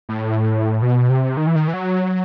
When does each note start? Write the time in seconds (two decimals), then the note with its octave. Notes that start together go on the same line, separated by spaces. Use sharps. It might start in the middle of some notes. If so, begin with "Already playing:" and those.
0.09 A2
0.82 B2
1.10 C3
1.37 D#3
1.47 E3
1.56 D#3
1.68 E3
1.74 F#3